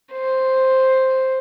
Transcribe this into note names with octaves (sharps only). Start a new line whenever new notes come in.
C5